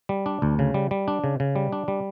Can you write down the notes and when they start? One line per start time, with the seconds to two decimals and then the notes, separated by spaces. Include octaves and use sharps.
0.09 G3
0.26 D4
0.42 D2
0.59 C#3
0.74 G3
0.91 G3
1.08 D4
1.24 C#3
1.40 C#3
1.56 G3
1.73 D4
1.88 G3